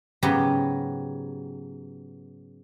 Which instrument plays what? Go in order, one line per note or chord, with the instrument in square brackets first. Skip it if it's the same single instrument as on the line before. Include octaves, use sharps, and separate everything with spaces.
[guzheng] G#2 C#3 F#3 B3 G4